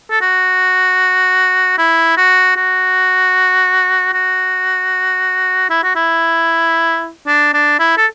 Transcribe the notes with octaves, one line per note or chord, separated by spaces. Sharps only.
A4
F#4
E4
F#4
F#4
F#4
E4
F#4
E4
D4
D4
E4
A4